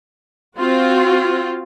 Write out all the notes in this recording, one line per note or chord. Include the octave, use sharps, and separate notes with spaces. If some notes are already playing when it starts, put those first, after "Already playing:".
C4 F4 F#4